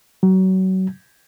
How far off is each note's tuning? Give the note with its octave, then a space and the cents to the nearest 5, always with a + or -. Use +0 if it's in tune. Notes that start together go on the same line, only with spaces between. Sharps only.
F#3 +30